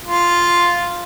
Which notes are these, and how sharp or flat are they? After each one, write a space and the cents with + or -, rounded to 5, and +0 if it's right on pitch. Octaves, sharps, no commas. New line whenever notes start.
F4 +0